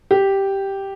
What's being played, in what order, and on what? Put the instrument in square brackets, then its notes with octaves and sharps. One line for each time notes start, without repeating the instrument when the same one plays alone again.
[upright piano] G4